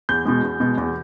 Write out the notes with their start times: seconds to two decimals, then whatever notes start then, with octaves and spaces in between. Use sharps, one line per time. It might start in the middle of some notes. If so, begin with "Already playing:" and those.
0.09 E2 G6
0.25 B2 G#3
0.43 E2
0.60 B2 G#3
0.77 E2